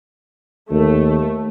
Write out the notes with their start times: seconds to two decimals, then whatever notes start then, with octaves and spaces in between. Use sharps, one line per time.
0.71 D#2 A3